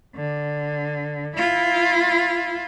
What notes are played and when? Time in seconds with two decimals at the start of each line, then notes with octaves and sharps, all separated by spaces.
0.16 D3
1.36 E4 F4